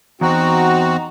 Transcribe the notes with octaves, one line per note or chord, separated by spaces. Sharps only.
E2 C4 D#4 F#4 F#5 A#5